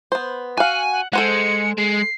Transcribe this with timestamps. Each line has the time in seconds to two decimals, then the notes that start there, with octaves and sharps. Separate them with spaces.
0.12 B3 C5
0.57 F#4 F5 F#5 G#5
0.92 F#5
1.13 G#3 A4 C5 F#5 C#7
1.78 G#3 C7